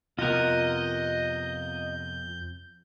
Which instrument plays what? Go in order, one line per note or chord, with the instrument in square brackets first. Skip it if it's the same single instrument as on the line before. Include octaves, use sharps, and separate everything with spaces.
[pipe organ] F2 G6 [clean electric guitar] C3 B3 A#4 [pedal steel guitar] F4 F#5 [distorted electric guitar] D#5